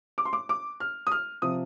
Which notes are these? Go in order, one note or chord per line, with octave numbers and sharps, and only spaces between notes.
D6
C6
D6
D6
F6
D#6
F6
C3 F3 D#6